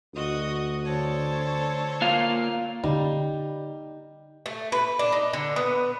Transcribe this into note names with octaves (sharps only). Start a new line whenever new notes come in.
D2 F#4 D#5 D#6
D3 A4 C5 C#5 A5
A#3 F4 F5
D3 G3 A#3 C#4 D#4
A3
B4
D4
D#4
D3
B3